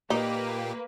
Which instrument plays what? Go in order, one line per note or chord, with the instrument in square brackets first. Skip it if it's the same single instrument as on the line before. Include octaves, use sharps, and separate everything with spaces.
[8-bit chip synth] A#2 G4 [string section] A#3 B4 [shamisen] D#4